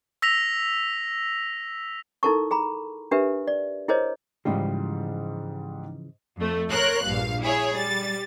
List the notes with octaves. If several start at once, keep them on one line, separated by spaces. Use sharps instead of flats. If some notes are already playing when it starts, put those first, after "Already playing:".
E6 A#6 B6 F7
D#4 E4 A4 A#4 A5 C#6
G#4 A#5 B5
D4 G4 A#4 B4 E5
D5
E4 G#4 A#4 C5 C#5 D#5
G#2 C#3 E3 F3 G3
F2 A3
A#4 C#5 C6 F#6
A#1 G2 F5
E4 G#4 C#5
G3 A6